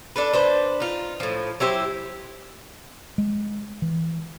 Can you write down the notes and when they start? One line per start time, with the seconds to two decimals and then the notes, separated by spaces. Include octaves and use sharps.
0.16 D4 A4 B4
0.33 D4 B4 C5
0.80 D#4 F4
1.20 A2 F3
1.60 F#3 E4 G4 C5
3.18 G#3
3.82 E3